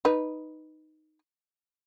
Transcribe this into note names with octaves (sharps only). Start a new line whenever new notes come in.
D#4 B4